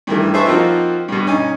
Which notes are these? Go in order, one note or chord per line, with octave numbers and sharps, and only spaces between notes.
G2 D#3 E3 A3
G#4 B4 C5 E5 A5 C#6
F3 A#3 C4 D#4 F4 F#4
G2 B2
C#4 D#4 G#5